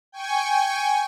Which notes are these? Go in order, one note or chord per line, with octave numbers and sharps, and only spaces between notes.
G5 G#5 C#6